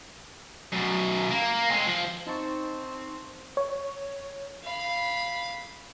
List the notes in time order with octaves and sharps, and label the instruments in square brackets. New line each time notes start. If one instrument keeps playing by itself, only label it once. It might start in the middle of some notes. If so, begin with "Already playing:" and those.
[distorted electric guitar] F#2 B2
A#3
G#3 C4
F3
[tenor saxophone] C4 [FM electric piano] D#4 A5 C#6
[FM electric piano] C#5
[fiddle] F5 B5